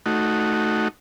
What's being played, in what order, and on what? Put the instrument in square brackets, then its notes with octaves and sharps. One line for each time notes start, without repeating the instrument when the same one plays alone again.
[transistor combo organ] A3 D#4 F#4